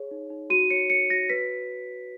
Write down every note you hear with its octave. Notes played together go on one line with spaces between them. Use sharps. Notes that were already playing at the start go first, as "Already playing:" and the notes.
Already playing: G#4 C#5
D#4
D#4
F#4 D#7
C#5 C#7
C#5 C#7
F#4 A#6
B4 B6